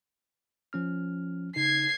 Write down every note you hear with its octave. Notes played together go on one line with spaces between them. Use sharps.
F3 C#4 F6
C#3 D#4 G#6 C7